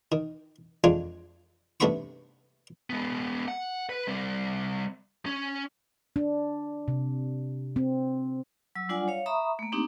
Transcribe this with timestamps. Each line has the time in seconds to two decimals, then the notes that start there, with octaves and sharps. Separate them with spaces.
0.12 D#3
0.84 F2 G#3 D4 F4 G#5
1.80 G2 C3 A3 B3 B5 C#6
2.90 G#3 B3
3.48 F#5
3.89 B4
4.07 G3 C4
5.26 C#4
6.16 D4
6.88 C3
7.76 C4
8.75 F#3 E6
8.89 G3 D4 F4 D5 F#5 G#5
9.08 C#5 F5
9.26 E5 A#5 B5 C#6 D#6
9.59 A3 A#3
9.72 A#3 C4 D4 D#4 G4